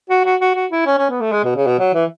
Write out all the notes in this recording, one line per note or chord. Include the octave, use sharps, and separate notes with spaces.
F#4
F#4
F#4
F#4
E4
C#4
C#4
B3
A3
G#3
B2
C#3
B2
F#3
E3